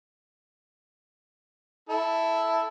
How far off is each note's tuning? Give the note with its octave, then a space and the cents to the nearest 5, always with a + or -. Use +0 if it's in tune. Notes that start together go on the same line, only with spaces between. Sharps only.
E4 +0 A4 +0